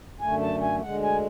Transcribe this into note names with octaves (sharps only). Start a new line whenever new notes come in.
F#2 D3 A3 G#5
A5
G#5
D2 D3 G#3 F#5
G#5